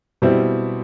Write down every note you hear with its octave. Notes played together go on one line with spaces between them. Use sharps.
B2 G3 C4 E4